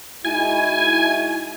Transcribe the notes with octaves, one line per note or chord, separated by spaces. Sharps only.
G#3 D#4 E4 F#4 G#5